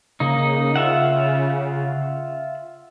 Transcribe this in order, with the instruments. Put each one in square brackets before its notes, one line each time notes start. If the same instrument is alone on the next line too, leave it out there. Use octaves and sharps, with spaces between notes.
[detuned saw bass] C#3 [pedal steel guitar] A#3 D#4
[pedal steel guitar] F4 E5 F#5